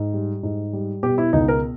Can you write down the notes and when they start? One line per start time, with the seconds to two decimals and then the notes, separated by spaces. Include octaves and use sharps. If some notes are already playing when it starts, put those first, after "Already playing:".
Already playing: G#2
0.13 G3
0.43 G#2
0.73 G3
1.03 B2 G4
1.18 E4
1.33 C#2 D#4
1.48 A#4